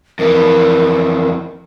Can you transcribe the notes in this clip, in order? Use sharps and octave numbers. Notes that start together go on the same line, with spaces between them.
F2 E3 A#4